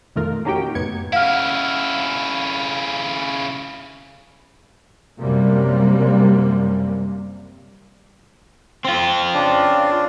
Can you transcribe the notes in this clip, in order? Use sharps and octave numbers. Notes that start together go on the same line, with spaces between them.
F2 B2 D#3 A3 F4 A#4
A#3 C#4 D#4 F#4 G4 G5
F#2 A2 C#3 B3 G#6 C#7
C#3 E4 F5 F#5 F6
F#2 C3 G3 A#3
C4 F4
C#3 D4